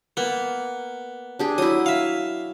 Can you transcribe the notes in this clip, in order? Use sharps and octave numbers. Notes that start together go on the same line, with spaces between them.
A#3 B3
D4 G4 G#4
F#3 E4 D#6
E5 F5